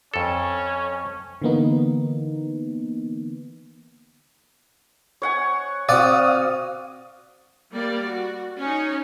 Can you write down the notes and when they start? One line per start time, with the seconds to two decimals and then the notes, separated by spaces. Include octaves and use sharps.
0.14 F2 C#4 A4
1.42 D3 E3 A#3 B3 D#4
5.22 C#5 F#5 G#5
5.89 C4 F#4 D5 F5 F#5 D#6
7.72 G3 A#3 D5
8.06 F#4
8.59 C#4 D#4